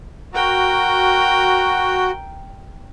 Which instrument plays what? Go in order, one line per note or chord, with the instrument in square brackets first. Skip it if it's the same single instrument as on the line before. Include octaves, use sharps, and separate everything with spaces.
[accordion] F#4 [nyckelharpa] A#4 G5